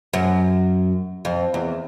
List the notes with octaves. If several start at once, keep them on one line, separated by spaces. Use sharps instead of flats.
F#2
F2
E2